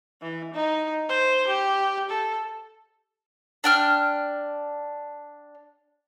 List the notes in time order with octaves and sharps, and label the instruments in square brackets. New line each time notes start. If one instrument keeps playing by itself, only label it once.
[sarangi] E3
D#4
C5
G4
A4
[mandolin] D4 G5 F6